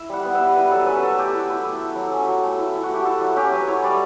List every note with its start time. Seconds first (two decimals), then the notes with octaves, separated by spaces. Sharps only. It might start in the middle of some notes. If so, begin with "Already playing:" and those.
Already playing: E4 E5
0.09 G3 F#5
0.25 B3
0.35 E5
0.41 G3
0.55 E4 B4
0.71 F#3 A4
0.87 C#4 B4
1.03 F#3 A4
1.18 A3 G4
1.34 E4
1.50 E4
1.65 A3
1.81 E4
1.96 F#3
2.12 C#4
2.27 F#3
2.44 A3
2.58 E4
2.75 E4
2.83 F#4
2.90 A3 G4
3.05 E4 A4
3.21 F#3 F#4
3.36 C#4 G4
3.52 F#3 B4
3.68 E4 C#5
3.84 G3 D5